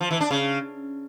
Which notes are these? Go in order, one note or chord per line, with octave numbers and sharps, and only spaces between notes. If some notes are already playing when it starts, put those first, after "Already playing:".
F3
E3
D4
C#3